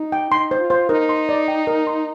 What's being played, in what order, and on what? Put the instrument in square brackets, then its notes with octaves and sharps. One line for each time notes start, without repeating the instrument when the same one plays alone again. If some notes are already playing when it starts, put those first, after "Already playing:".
Already playing: [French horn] D#4
[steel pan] G5
[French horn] D#4 [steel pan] C6
[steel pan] C5
[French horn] F4
[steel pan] C5
[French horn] D#4 [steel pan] A#4
[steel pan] C6
D5
G5
A#4
C6